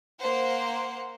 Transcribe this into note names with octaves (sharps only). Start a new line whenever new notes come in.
A#3 C5 F#5